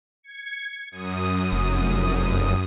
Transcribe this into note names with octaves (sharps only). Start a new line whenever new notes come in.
G#6 C#7
F#2 D#6
F1